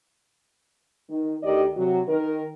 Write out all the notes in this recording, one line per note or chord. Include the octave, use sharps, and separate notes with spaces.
D#3
D2 D#3 D#4 G4 D5 D#5
C3 F#3 F#4
D#3 A#4